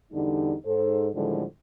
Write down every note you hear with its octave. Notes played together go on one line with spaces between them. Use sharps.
E2 D3 G3 D#4
G#2 A4 C5
A2 D3 D#3 F3 G3 G#3